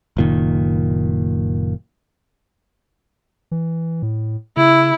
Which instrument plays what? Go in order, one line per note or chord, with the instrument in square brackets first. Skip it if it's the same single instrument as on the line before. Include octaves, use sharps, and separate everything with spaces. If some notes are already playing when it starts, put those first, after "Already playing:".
[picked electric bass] F#1 A#2 D#3
[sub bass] E3
A2
[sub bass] C#3 [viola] E4